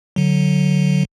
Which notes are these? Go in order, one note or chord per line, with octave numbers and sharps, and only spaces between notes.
D3 F#3